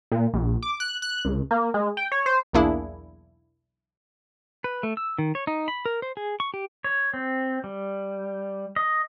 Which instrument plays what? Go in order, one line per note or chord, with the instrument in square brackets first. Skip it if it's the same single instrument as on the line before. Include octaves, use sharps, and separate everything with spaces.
[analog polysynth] A#2
A#1
D6
F#6
F#6
C#2
A#3
G#3
G5
C#5
C5
[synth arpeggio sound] B1 E2 A#3 D4 E4 G#4
[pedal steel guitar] B4
A3
E6
D#3
C#5
D#4
B5
A#4
C5
G#4
C#6
G4
C#5
C4
G3
D#5